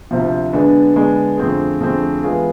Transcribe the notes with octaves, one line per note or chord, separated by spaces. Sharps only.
D2 C3 F3
D3 G#3 B3 D4
D3 G#3 B3 D4
F2 D3 A3 C4 G#4
F2 D3 A3 C4 G#4
E3 G#3 B3 F4 G#4